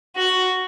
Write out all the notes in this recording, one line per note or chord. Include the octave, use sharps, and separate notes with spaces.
F#4